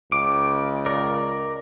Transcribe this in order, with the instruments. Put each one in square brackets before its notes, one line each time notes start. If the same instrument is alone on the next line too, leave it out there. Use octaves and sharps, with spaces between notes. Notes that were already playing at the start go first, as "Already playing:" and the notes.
[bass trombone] C#2 [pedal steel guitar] D6
[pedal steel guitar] A#4 D5